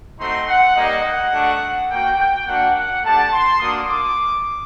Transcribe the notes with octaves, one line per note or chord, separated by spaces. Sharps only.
A3 C4 D#4 F#4 C6
F#5
G3 A#3 D#4 D#5
F#5
A3 D4 F#4
A#3 F#4 G5
G5
A#3 D4 F#4 F#5
F#5
A3 D4 G4 A5
C6
A#3 D4 F#4 D#6
D6